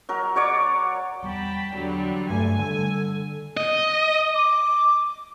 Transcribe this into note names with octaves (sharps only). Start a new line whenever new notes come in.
F#3 A#4
F#4 C#5 D5 D6
E2 G3 G5 A5 B5
E2 D3 F#3 G3
F1 G2 A3 G#5
D3 G3 A4
D#5
D6